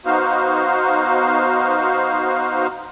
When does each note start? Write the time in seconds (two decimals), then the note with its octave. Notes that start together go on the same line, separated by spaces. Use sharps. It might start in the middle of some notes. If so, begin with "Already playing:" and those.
0.06 B3 D#4 F#4 C5 F5